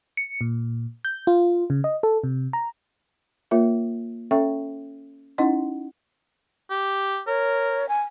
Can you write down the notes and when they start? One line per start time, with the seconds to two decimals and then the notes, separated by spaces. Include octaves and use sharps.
0.17 C#7
0.41 A#2
1.05 G6
1.27 F4
1.70 C#3
1.84 D#5
2.03 A4
2.24 C3
2.53 A#5
3.51 A#3 F4 A#4 C#5 E5
4.31 C#4 A4 C#5 E5 G5 C#6
5.38 C#4 D#4 E4 D#5 F#5 C6
6.70 G4
7.27 A#4 C#5
7.89 G#5